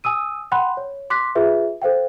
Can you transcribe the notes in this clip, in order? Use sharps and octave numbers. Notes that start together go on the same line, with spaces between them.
G#5 D#6 E6 D#7
F#5 G5 B5 C6 F#6
C#5
C6 D6 F#6 B6
F4 G#4 B4 E5
A4 C5 F5 G5